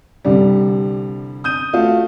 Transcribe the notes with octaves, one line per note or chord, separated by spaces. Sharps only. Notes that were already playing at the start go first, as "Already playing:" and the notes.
C2 D3 G3
D#6 G6 D#7
A3 F4 F#4